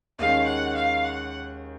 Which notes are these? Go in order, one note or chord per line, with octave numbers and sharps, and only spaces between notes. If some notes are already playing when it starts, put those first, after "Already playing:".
D#2 D#3 G#3 C#4 F5
F#5
F5
F#5